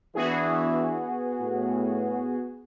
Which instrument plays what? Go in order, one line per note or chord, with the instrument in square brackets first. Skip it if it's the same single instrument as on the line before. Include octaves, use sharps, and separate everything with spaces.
[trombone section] E3 D4 E4 [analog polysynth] B3 F#4 G#4
[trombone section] A2